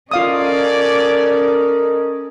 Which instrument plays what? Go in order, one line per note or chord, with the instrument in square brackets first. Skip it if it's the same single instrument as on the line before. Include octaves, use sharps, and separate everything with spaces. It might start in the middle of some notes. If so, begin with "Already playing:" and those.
[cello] C#4 [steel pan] F4 F5 D#6 [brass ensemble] A4 A#4 D#5 [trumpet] D5